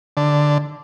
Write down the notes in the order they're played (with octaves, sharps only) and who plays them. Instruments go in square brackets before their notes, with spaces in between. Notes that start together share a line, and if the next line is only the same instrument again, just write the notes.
[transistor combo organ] D3